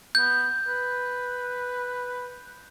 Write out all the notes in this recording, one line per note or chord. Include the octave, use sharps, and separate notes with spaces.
B3 G6
B4